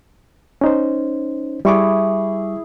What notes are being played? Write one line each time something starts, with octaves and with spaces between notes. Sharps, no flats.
C#4 D#4 C5
G3 E4 G#4 C#6 D6